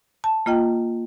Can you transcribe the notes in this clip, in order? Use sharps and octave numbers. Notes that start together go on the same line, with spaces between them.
A5
A#3 F4 D#5 G5